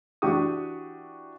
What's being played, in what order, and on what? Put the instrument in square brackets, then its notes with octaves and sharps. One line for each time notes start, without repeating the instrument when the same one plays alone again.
[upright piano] E3 D4 F#4 G4 C#6 D#6